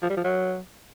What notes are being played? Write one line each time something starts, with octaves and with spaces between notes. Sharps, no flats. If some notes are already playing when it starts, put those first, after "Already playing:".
F3
G3
F3
F#3